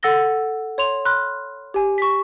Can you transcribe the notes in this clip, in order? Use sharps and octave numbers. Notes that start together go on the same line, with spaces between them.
A4 F#5 E6 A6 A#6 G7
C#5 C6 F7
B5 C6 F6 F#6
G4 G#5
C#6 B6